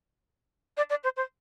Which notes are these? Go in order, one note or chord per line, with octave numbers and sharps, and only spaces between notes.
D5
D5
C5
C5